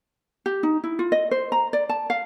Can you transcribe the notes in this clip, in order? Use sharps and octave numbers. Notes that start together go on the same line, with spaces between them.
G4
D#4
E4
F4
D#5
C5
A#5
D5
A5
F5